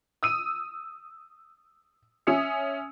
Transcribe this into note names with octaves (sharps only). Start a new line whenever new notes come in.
D#6 E6 D#7
C#4 E5 D#6 E6 C#7